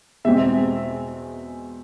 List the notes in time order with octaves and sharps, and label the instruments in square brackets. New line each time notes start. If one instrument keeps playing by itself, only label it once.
[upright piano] E2 B2 G#3 C4 E5